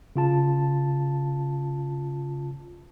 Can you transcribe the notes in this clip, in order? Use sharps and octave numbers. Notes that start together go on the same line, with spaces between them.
C#3 F4 A5